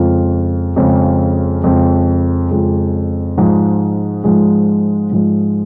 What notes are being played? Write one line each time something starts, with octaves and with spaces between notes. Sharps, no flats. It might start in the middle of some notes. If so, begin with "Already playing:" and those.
Already playing: F2 C#3 G#3 C4 F4
F2 C#3 G#3 C4 F4
F2 C#3 G#3 C4 F4
F2 C#3 G#3 C4 F4
G#2 F3 G#3
G#2 F3 G#3
G#2 F3 G#3